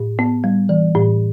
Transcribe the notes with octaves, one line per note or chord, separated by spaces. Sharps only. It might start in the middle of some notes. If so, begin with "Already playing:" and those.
Already playing: A2
B3
G3
E3
A2